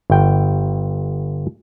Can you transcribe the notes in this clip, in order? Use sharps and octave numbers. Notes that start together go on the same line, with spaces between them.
G1 G5